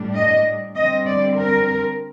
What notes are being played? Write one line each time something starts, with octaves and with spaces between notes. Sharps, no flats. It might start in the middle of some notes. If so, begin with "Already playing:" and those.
Already playing: A2 G3 D4
D#5
D3 G3 C4 D#5
D5
A#4